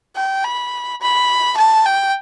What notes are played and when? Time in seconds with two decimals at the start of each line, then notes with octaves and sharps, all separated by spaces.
0.16 G5
0.44 B5
1.01 B5
1.57 A5
1.86 G5